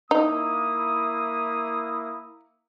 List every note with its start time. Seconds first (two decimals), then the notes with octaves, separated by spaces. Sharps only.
0.11 A#3 D#4 E4 D#6